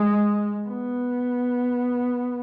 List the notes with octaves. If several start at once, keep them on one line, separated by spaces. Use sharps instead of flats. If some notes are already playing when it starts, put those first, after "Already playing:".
Already playing: G#3
B3